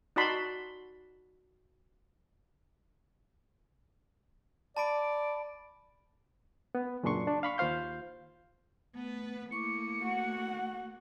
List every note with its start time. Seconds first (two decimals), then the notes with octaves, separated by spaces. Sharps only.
0.16 D#4 F#4 D5 A5 B5 C6
4.77 D5 A5 B5 D7
6.75 B3
7.04 F#2 A#2 C#3 D4 C6 C#6
7.27 D4
7.43 F5 B5 C#6
7.58 D#2 F4 C5 F5 G6
8.96 A3 B3 B4
9.51 A3 A#3 E4 C#6 D6 C#7
10.03 F#4 F#5 C#6